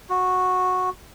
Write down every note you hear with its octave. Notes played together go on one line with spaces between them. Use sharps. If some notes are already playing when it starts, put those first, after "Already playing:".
F#4